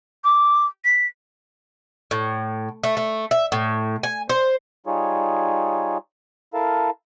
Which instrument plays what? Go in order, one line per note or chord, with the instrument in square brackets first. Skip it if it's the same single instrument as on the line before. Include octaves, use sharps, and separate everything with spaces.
[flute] D6
B6
[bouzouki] A2
A3
A3
E5
A2
G#5
C5
[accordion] G3 D#4 F4 G#4 C#5
E4 A4 A#4 F5 A5